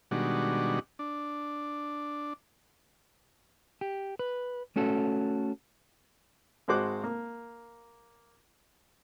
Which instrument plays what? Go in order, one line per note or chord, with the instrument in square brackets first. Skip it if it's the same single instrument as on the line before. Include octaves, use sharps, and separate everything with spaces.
[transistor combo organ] B2 D#3 G3 G#3 D4 F#4
D4
[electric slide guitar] G4
B4
A3 C#4 F#4 A4
[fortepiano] G#1 G#3 F#4 C5 D6 F#6
A#3